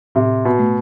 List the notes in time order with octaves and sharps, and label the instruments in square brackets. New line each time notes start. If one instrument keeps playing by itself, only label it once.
[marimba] A2 [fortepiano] C3
[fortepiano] B2
[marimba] A3